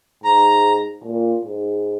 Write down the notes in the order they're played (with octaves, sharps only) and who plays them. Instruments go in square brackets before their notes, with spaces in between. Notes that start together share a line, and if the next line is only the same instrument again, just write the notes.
[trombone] G#2 [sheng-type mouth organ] A#5
[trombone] A#2
G#2